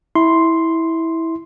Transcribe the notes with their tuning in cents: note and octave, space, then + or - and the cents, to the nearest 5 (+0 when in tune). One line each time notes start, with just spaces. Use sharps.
E4 -15 C6 +0